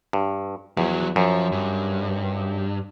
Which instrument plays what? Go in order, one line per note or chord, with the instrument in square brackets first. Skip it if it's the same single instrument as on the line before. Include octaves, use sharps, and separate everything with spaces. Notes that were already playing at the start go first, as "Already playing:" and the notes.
[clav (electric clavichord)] G2
[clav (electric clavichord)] E2 [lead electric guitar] F3 F#3
[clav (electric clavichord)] F#2 [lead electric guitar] F3
[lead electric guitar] G2